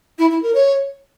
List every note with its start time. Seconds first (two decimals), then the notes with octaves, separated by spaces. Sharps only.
0.19 E4
0.30 E4
0.42 A#4
0.54 C#5